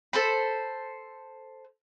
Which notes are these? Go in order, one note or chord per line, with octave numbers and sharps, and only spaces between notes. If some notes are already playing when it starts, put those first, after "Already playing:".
A4 C5 B5